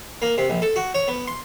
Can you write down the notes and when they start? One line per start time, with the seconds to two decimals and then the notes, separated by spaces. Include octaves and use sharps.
0.22 A#3
0.38 C3
0.50 A#1
0.62 A4
0.76 F#4
0.95 C#5
1.08 B3
1.27 C6